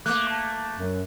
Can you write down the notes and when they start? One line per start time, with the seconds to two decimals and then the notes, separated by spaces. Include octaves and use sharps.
0.06 A3 A#3 D6 F#6
0.30 A5
0.77 F#2 F#3